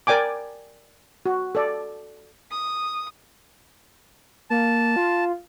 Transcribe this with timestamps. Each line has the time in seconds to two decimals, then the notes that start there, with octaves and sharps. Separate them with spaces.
0.07 A#4 D5 G5 G#5 D6
1.26 F#4
1.55 A4 D5
2.51 D#6
4.50 A#3 A5
4.96 F4